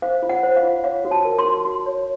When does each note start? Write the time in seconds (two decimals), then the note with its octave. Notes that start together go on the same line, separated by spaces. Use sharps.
0.02 C5 F5
0.22 F4
0.29 F#5
0.43 C5
0.56 F5
0.63 F4
0.84 C#5 F5
1.05 F#4
1.11 A5
1.25 A#4
1.38 C6
1.45 F#4
1.65 F#4
1.86 C#5